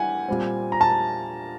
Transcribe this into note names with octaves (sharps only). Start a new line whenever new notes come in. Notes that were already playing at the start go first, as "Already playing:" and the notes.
Already playing: E3 G3 G4 F#5 G#5
A#2 G3 C4
A#5
A5